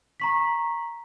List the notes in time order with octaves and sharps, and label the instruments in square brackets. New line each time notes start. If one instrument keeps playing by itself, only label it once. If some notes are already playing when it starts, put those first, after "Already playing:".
[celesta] A#5 C#6 B6